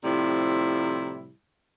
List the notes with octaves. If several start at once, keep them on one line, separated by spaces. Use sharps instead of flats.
A2 C3 F3 G3 E4